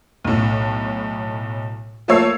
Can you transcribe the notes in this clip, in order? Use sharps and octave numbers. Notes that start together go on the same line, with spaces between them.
B1 A2
F3 A3 A#3 C#5 E6 C7